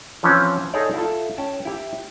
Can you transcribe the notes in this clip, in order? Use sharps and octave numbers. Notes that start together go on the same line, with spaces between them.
E3 F3 C4 C#4
D#4 G#4 A4 C#5 D5
E4 F4 A4
C#4 G5 A5
E4 G4